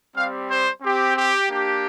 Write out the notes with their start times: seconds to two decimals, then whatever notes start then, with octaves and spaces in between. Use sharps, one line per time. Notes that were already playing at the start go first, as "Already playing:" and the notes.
0.16 G3 C4 G4 F5
0.50 C5
0.82 C4 G4
1.16 G4
1.49 A#3 D4 G4